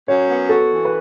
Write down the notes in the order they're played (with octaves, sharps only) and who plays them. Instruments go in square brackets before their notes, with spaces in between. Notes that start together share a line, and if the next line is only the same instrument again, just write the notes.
[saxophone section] F#2 [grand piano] C#5
[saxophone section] B3
[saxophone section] F#4 [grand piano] A4
[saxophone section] E3
[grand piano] B4